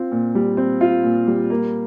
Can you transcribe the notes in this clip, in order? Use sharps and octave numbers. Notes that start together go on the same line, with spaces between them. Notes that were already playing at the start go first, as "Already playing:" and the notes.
Already playing: C4 F4
A#2
G3
C4
F4
A#2
G3
A#3